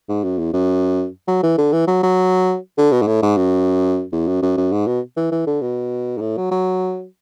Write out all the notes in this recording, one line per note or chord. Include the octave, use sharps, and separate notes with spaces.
G#2
F#2
E2
F#2
F#3
E3
D3
E3
F#3
F#3
D3
B2
G#2
A2
G#2
F#2
E2
F#2
F#2
F#2
G#2
B2
E3
E3
D3
B2
G#2
A2
F#3
F#3